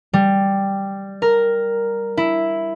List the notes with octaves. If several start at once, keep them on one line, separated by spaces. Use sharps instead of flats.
G3
A#4
E4